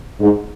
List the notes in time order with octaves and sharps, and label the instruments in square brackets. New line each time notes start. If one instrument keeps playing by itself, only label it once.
[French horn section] G#2